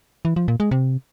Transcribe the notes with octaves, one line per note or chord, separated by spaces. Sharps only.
E3
F3
A#2
G#3
C3